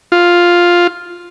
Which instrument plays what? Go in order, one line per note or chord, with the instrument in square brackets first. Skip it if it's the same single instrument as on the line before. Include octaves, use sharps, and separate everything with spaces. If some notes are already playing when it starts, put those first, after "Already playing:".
[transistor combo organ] F4